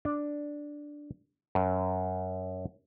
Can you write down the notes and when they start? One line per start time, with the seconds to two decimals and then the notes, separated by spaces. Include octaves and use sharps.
0.05 D4
1.55 F#2